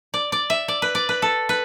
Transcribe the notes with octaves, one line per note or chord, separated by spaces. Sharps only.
D5
D5
E5
D5
B4
D5
B4
A4
B4